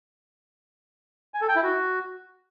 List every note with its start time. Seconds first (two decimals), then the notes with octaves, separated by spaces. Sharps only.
1.34 G#5
1.41 A4
1.49 G5
1.56 E4
1.63 F#4